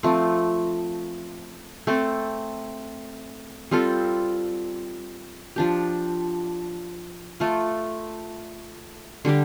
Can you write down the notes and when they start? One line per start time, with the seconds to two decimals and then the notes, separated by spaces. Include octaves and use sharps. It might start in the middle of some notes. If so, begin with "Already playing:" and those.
0.03 F3 A3 C4
1.87 A3 C4 A4
3.71 G3 C4 F4 A4
5.56 F3 D4 G4
7.40 A3 F4 A4
9.25 D3 G3 D4 G4